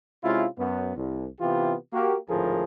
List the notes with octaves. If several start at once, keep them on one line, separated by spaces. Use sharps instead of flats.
C3 G#3 C#4 E4 F4
F#2 B3
C2
C3 E3 B3 F4 G4
A#3 F#4 G4
G#1 D2 A2 F3 G#4 A#4